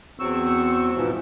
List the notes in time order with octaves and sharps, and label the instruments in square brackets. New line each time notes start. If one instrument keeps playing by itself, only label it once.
[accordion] E2 F#3 C4 C#6 E6
G#2 B2 E3 F3